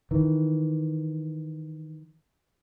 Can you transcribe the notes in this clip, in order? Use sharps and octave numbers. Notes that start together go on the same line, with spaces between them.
D#3 E3